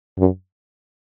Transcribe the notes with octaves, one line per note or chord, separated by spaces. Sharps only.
F#2